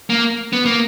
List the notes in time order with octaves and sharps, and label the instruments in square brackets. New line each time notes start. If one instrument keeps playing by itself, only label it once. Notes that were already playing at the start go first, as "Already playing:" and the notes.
[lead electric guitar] A#3
B3
A#3